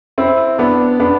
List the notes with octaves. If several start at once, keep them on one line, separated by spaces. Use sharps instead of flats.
C4 E4
B3 D4
B3 D4